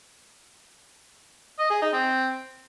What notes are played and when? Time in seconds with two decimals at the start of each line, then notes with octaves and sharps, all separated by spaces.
1.59 D#5
1.71 G#4
1.82 D#4
1.93 C4